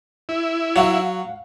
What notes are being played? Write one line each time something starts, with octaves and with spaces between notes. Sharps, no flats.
E4
F#3 F5 F#5